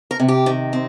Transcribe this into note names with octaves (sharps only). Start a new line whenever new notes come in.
A#4
C3
G4
D#3
C4